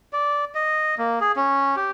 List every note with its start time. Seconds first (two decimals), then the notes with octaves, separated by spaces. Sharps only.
0.13 D5
0.55 D#5
0.98 A#3
1.21 G#4
1.36 C#4
1.76 G4